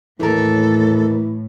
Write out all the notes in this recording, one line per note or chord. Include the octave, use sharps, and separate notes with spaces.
D#2 A2 E3 A4 A#4